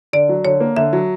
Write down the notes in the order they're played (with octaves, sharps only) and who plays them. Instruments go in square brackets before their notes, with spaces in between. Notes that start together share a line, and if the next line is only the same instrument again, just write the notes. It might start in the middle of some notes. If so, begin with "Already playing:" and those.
[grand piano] D3 [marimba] D5
[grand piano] F#3
[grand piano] D3 [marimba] C#5
[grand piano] A#3
[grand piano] D3 [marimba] E5
[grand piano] F#3